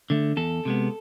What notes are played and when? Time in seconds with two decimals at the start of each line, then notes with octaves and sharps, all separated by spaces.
0.10 D3 A3
0.37 E2 A4
0.65 C3 G#3 B3